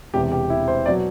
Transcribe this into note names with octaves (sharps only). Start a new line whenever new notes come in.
E1 E2 C3 G4
G4
E4
C5
B2 F#3 D5